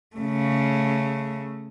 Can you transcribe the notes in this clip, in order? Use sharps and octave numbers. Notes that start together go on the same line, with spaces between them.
C#3 A3